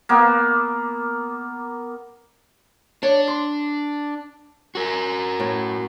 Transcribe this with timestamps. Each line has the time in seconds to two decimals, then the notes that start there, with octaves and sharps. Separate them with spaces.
0.09 A#3 B3
3.03 D4 C#5
3.28 C6
4.75 F#4 A#4
5.40 A2